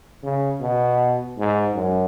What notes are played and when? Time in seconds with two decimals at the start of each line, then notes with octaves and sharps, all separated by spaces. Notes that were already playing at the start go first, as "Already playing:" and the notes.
0.23 C#3
0.61 B2
1.38 G#2
1.75 F#2